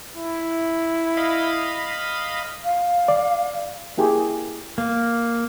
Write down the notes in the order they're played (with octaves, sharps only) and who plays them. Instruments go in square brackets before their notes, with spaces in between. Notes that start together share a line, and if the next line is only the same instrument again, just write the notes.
[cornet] E4
[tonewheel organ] D#5 F5 B5
[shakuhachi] F5
[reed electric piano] D5
[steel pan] A#3 E4 G4 G#4
[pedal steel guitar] A#3